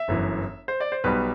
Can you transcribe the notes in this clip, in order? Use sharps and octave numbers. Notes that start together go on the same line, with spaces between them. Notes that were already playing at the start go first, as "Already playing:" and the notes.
Already playing: E5
G1 F#2 E3
C5
D5
C5
B1 B2 G3 B4